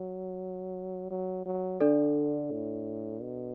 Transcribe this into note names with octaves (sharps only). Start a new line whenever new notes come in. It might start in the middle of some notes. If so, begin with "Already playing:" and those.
Already playing: F#3
F#3
F#3
D3 D4 A4 D5
A2
B2